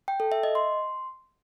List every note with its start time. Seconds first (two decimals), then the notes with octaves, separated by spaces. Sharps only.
0.08 G5
0.20 A4
0.32 E5
0.43 D#5
0.55 C6